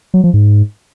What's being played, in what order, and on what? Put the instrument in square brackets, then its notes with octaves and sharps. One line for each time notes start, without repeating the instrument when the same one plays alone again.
[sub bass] F#3
F3
G#2